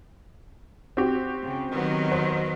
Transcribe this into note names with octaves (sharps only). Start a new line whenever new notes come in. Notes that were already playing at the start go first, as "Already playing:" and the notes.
C4 F#4 G4
C#3
D#3 F#3 B3
C5